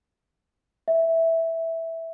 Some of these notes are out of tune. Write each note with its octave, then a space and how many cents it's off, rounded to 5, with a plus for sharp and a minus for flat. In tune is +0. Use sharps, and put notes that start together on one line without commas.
E5 -5